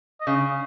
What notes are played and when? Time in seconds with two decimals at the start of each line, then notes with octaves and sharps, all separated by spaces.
0.21 D#5
0.27 C#3 C#5